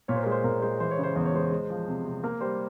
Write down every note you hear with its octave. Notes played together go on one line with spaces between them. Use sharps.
A#2 C#5
C5
A#4
G#3
C5
A#2 A#4
G#3 C5
E3 C5
C#5
C#3
C5
E2 C5
C#5
G#3 C5
G#3
F3
C3
C3
A#3 A#4
G3 C5